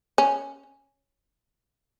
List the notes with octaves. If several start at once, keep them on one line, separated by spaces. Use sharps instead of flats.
C#4